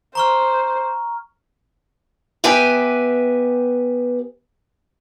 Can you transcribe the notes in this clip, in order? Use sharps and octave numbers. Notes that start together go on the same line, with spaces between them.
C5 A#5 C#6 F6
B3 G4 B4 E5 G5 G#5